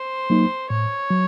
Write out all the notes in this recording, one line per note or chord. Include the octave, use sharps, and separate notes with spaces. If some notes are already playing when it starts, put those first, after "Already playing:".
Already playing: C5
F#3 A#3 D#4
A2 C#5
F#3